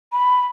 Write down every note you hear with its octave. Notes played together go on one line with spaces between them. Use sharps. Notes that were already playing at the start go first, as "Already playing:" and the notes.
B5